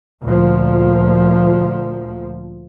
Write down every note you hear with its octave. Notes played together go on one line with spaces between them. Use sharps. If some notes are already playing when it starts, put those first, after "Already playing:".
D2 A#2 F3